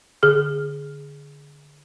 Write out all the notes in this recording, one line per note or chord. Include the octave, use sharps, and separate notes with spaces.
D3 G#4 F6